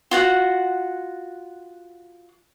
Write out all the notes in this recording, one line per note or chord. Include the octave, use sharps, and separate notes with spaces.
F4 F#4 F#5